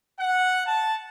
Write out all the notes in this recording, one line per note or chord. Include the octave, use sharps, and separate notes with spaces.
F#5
A5